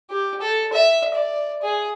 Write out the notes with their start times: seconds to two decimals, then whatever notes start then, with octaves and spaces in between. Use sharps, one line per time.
0.10 G4
0.41 A4
0.73 E5
1.14 D5
1.62 G#4